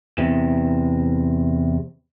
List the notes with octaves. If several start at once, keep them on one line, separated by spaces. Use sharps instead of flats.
E2 C3